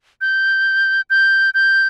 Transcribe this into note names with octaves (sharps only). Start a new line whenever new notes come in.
G6
G6
G6